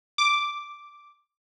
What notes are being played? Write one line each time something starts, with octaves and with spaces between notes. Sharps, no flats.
D6